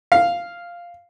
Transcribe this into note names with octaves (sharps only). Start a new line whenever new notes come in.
F5